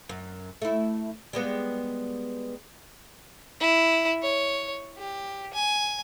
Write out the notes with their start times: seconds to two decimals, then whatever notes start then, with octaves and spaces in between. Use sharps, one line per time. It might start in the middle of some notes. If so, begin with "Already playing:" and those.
0.09 F#2
0.62 A3 E4
1.33 G3 G#3 B3
3.60 E4
4.23 C#5
4.98 G4
5.54 G#5